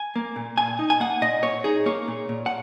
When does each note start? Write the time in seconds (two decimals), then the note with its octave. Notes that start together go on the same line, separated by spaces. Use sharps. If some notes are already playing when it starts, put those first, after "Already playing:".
Already playing: G#5
0.16 A#3
0.36 A#2
0.58 A#2 G#5
0.79 D#4
0.90 G#5
1.00 A#3 F#5
1.21 A#2 D#5
1.43 A#2 C#5
1.64 D#4 G#4
1.86 A#3 C#5
2.08 A#2
2.29 A#2
2.46 F#5